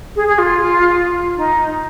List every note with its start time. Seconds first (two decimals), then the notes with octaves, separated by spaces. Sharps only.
0.16 G#4
0.27 G#4
0.38 F4
1.37 D#4